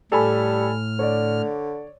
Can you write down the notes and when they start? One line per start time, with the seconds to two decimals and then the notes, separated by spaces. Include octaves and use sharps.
0.12 A2 G3 A4 G#5 B5 F6
0.99 D3 C#5 D5